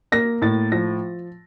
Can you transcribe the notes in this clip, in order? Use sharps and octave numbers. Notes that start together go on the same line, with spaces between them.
A#3 A#6
A2 A6
F3 A#6